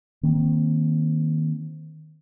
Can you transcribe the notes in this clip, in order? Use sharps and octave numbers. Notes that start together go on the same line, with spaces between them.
D#3 A#3 C4